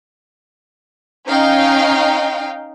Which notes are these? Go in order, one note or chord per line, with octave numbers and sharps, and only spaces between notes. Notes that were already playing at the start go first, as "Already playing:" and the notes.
C#4 D#4 F5 G5